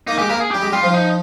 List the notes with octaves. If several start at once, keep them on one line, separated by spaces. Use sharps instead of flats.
A#3 D#4
G#3 G4
A#3 A#4
G#4
G3 G4
G#3
G3 F4
F3
D#4